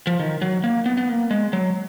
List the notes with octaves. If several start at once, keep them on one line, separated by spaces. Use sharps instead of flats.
F3
D#3
F#3
A#3
B3
B3
A#3
G#3
F#3